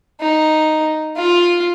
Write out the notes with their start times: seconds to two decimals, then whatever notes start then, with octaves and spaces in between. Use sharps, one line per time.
0.20 D#4
1.17 F4